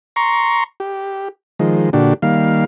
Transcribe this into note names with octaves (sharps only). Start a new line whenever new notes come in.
A#5 C6 C#6
G4
D#3 F3 G#3
A#2 D3 D4 F#4 G4
D#3 G3 A#3 F5